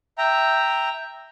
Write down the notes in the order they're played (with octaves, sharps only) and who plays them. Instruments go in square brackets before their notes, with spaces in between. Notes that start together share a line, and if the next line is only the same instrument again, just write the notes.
[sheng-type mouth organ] E5 G5 A#5